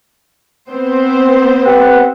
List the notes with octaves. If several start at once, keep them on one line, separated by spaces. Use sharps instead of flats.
B3 C4 C5
G4 B4 F#5